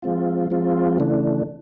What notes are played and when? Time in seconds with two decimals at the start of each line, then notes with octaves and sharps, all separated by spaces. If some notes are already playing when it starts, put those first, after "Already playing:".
0.02 F3 G#3 C4 F4
0.50 F3 G#3 C4 F4
0.98 C#3 E3 A3 D4